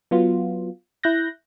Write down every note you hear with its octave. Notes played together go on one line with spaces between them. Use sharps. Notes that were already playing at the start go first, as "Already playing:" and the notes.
F#3 B3 F4
E4 F#6 G6 A#6